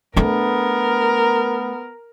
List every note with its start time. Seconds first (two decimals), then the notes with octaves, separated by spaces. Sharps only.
0.16 A3 B3 D4 A#4